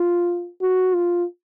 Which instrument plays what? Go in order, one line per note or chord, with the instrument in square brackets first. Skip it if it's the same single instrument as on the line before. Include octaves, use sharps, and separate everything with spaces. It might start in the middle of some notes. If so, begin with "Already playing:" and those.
Already playing: [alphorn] F4
F#4
F4